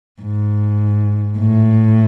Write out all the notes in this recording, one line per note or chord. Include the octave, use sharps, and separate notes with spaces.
G#2
A2